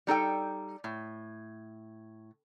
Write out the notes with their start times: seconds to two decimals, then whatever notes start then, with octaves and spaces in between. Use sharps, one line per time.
0.07 G3 D#4 A4 G5
0.84 A2